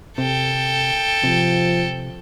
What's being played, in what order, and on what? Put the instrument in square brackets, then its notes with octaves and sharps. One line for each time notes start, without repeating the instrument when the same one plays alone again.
[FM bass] C3 [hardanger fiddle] A4 G5
[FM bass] C3 [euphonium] F3